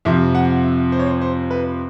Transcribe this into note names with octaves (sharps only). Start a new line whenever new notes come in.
F2 C3 F3 E5
F#5
E5
C5
C#5
C5
C5
B4